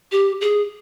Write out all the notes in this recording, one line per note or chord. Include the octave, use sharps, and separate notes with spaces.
G4
G#4